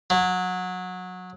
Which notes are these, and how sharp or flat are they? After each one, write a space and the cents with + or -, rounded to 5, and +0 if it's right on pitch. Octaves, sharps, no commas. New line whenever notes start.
F#3 -20